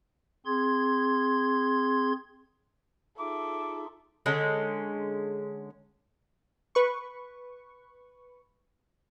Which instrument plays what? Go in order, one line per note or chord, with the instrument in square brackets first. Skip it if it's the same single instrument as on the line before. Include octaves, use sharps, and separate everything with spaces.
[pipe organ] C4 G#4 C6 G#6
[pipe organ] D#4 F4 G#4 [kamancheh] A4 E5 [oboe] D6
[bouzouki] D3 G#3 C#4
[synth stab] B4 C#6